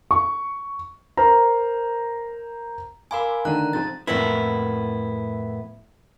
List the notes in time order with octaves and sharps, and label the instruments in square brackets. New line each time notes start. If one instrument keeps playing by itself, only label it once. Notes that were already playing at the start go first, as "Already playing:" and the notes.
[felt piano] C#6
[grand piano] A#4 C5 A#5
[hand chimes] A#4 F5 G#5 [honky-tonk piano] B5 C6 D6
[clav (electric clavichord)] D3 D#3 [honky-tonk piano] A3 D#7 [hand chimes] A#5 F#6
[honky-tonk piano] G#2 F3 C4 [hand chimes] A6
[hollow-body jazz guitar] F2 A2 A#3 B3 E4